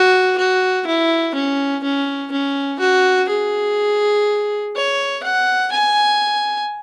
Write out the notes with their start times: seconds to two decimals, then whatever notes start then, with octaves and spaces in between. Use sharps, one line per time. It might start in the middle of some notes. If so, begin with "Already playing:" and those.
Already playing: F#4
0.38 F#4
0.87 E4
1.35 C#4
1.84 C#4
2.32 C#4
2.80 F#4
3.30 G#4
4.76 C#5
5.23 F#5
5.72 G#5